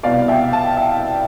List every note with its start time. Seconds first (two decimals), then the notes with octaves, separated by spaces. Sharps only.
0.03 C2 B2 B3 D5 F5
0.28 E5 G5
0.53 F5 A5
0.77 E5 G5